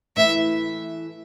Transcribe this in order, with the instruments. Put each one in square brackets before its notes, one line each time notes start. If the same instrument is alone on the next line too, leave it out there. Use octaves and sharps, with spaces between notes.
[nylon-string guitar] E3 A3 E4 [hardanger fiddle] E5